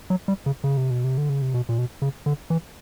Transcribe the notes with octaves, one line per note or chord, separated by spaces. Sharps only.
F#3
G3
C#3
C#3
C3
B2
C3
D3
C#3
C3
B2
A#2
B2
C#3
D3
E3